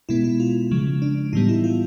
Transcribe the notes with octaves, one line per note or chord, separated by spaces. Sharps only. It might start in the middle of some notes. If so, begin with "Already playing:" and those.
B2 G#3 B3 E4
E4
F4
C#3 F3 G#3
D4
A2 E3 G3 B3 D#4
E4
F4